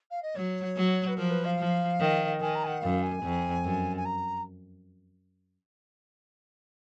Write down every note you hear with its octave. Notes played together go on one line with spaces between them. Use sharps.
F5
D#5
F#3 C#5
F#3
B4
F3 A#4
B4
F5
F3
D#3
D#3 G#5
A#5
G#5
F#5
F#2 F5
G#5
F2
F#2
G#5
A#5